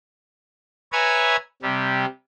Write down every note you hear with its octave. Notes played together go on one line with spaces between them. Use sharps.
B4 C#5 E5 G#5 A#5 G#6
C3 G3